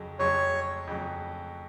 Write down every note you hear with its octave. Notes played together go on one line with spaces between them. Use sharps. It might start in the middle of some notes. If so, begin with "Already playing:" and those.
Already playing: F2 C#3 F#3
F2 C#3 F#3 C#5
F2 C#3 F#3